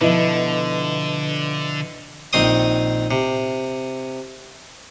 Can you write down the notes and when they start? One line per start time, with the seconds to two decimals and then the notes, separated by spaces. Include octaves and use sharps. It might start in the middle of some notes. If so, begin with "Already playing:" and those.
0.01 B2 D3 F3 E4 B4 D#5 E5
2.33 A#1 D#3 C4 C6 D#6
3.11 C3